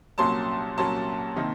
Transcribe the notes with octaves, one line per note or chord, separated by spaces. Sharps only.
C2 A#2 F#3 A#3 C#4 A5 C6
C2 A#2 F#3 A#3 C#4 A5 C6
C3 D#3 A#3 D#4